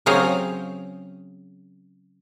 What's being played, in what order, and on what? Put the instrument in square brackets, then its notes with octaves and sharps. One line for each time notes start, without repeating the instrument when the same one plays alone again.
[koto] C#3 F#3 C4 G#4 C#5 F5